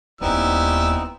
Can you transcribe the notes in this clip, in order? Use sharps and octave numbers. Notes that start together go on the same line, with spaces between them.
D#1 D#2 E3 G3 B3 C4 D#4 E6